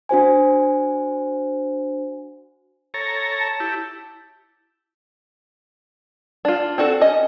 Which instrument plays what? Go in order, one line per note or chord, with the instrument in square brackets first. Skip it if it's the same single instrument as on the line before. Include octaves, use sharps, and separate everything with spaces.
[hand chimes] D4 F#4 C5 G#5
[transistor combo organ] A4 C#5 A#5
[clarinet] A5
[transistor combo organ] E4 G4
[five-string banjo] D4 F4
C4 D4 F#4 A4
C#4 D#5